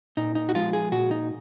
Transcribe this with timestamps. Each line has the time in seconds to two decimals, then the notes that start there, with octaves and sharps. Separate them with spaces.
0.17 A#2 D#4
0.35 D#4
0.49 F#4
0.55 F3 G#3 B3 F4
0.73 G#4
0.92 A#2 F#4
1.11 D#4